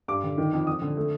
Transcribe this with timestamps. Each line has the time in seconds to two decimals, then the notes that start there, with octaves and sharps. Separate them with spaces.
0.08 G2 D6
0.23 D3
0.38 D#3
0.53 F2
0.67 F2 D#6
0.82 D3
0.97 A3